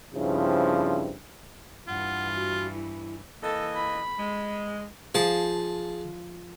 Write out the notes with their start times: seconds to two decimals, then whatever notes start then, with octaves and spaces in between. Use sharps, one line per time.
0.15 G2 C#3 F3 C4 E4
1.88 G2 E3 F4 F#5
2.36 F#4
2.73 E4
3.43 E3 A#3 A4 D#5
3.76 B5
4.19 G#3
5.15 F3 G#4 A5